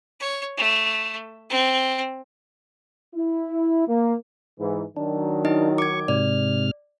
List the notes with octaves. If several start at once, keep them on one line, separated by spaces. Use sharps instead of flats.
C#5
A3
C4
E4
A#3
G#2 E3
D#3 F#3 D4
D#4 E4 D#5
C#6 D6 G#6
G#2 C3 D5 F6